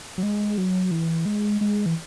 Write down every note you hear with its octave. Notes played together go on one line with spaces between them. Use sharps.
F#3
G#3
F#3
E3
G#3
G#3
E3